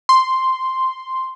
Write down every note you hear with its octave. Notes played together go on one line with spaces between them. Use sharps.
C6